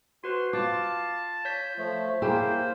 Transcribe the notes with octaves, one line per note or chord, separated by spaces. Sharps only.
F#4 B4 C5 C6
F4 F5 A5 D6
C#5 G6 B6
F3 A3
A#3 E4 G#4 C5 G5